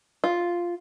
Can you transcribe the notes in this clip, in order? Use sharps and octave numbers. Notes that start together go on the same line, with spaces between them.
F4